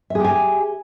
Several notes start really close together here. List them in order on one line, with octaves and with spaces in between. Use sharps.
E5 G#4 G4 G#5